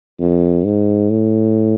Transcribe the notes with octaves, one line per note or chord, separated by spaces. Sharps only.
F2
G#2
A2